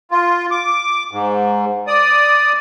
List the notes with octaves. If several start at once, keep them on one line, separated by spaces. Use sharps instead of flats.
F4
D6
G#2
D5 D#6